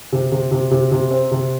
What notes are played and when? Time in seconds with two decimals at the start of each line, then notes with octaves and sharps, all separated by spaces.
0.13 C3
0.32 C3
0.52 C3
0.71 C3
0.92 C3
1.11 C4
1.31 C3